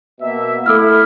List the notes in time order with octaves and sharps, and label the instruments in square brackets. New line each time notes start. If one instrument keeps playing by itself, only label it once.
[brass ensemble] B2 A#3 E5
[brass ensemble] A3 E4 [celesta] A4 E6 F6